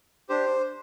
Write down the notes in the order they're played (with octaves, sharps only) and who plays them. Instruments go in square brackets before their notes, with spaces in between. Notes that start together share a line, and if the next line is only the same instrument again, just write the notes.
[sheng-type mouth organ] D4 G4 C5